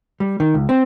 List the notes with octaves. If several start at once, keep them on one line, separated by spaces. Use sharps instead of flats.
G3
D#3
C#2
C4